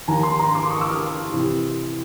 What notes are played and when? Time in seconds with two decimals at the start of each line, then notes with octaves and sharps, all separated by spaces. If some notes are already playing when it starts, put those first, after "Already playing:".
0.08 D#2 D#3 G#5 A#5
0.23 A#5 C6
0.39 A#5 C6
0.55 C6 D6
0.65 D6
0.70 C#6 D#6
0.80 D6 E6
0.91 D#6 F6
1.32 C3 E3